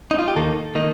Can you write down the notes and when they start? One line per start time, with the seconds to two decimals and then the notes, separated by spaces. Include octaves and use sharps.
0.11 D#4
0.19 F4
0.28 G4
0.36 D#2 D#3 A#3 D#4 A4
0.75 D#3 A#3 D#4